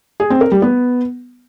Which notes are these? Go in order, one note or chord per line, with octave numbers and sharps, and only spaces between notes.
G#4
C4
A#4
G3
B3